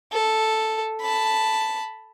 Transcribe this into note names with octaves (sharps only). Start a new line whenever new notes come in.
A4
A5 B5